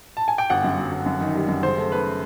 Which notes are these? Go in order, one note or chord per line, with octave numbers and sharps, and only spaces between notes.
A5
G#5
G5
G1 F#5
F#2
F#3
G1
F#2
D#3
G3
F#2
C#3 C5
A3
A3 B4